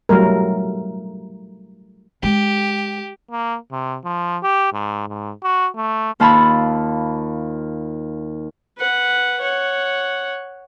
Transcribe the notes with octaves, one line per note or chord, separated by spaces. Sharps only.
F#3 G3 A3 A#4
G#3 G4
A#3
C3
F3
G4
G#2
G#2
F#4
A3
D#2 F4 A5 B5 E6
B4 F#5
C#5 F#5